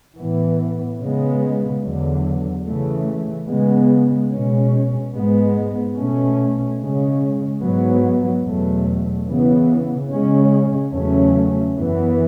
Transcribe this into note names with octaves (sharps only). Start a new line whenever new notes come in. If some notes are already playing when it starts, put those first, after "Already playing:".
A2 E3 B3
C#3 G#3 B3
E2 D3 F#3
C#3 E3 A3
C#3 G#3 B3
B2 G#3 C#4
G#2 G#3 B3
B2 A3 C#4
C#3 G#3 C#4
G#2 F#3 B3
E2 B2 F#3 A3
C#3 E3 B3
C#3 G#3 C#4
E2 C#3 F#3 A3 C#4
F#2 E3 B3